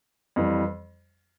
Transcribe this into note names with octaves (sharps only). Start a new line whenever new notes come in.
F2 E3 G3